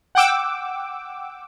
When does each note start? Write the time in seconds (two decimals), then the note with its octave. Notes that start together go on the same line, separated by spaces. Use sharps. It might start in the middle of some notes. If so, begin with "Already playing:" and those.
0.15 F#5 G5 D6 E6